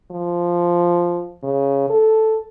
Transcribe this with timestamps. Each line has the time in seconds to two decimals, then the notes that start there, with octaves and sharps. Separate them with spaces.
0.11 F3
1.44 C#3
1.90 A4